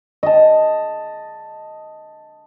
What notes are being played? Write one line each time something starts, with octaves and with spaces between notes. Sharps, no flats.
D#5 A5